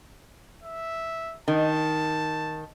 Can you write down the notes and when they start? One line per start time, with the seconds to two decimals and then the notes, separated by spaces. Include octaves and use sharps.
0.63 E5
1.48 D#3 A5